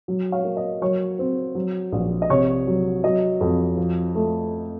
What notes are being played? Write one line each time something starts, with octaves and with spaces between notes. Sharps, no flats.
F#3
C#5 F5
A#3
D#5
F#3 C#5
C4
F#3
A#1
D#5
C3 C#5
F#3
F#3 D#5
F2
F3
A3